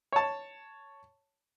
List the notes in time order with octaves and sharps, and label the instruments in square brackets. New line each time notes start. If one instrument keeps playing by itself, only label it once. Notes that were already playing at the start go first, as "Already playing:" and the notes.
[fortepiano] C#5 A5